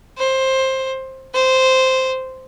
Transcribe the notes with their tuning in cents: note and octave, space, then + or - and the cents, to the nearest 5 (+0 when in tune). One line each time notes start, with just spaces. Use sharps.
C5 +15
C5 -5